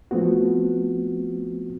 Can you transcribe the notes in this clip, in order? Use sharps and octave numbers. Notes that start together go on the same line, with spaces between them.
F3 A3 B3 C4 F#4